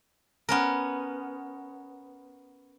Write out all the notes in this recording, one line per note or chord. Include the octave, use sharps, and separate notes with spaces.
B3 C#4 A#4